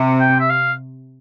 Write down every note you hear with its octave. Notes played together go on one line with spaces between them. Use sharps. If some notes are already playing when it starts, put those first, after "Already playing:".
Already playing: C3
G5
E5
F5